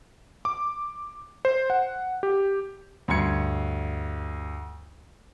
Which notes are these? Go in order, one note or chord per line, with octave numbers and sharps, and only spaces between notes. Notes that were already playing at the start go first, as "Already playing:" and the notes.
D6
C5
F#5
G4
D2 G2 C6 G#6 C#7